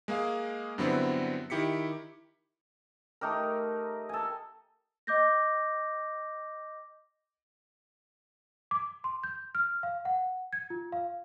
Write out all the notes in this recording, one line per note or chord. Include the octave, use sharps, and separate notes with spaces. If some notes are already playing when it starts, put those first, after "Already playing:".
G#3 A#3 G#4 F5
G2 D3 F#3 B3 C4 E4
D#3 E4 G4 B6 C#7
A3 D#4 G4 A#4
A4 G#5
D#5 D6 G6 A#6
D6
C6
G6
F6
F5
F#5
G#6
F4
F5